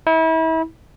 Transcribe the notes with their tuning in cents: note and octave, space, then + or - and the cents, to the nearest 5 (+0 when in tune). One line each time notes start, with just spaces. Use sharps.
E4 -35